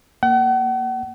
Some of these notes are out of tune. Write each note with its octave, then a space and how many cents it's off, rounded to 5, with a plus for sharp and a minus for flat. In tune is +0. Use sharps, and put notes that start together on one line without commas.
A#3 +0 F#5 +40